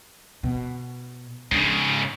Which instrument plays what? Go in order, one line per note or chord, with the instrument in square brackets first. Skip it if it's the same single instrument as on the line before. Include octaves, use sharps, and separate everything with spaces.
[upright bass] B2
[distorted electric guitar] G#2 C#3 [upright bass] D4